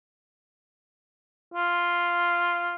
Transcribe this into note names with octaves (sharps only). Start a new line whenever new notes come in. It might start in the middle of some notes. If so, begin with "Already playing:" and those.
F4